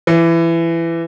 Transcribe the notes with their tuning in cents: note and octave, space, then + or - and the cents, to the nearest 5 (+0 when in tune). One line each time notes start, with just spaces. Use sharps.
E3 +20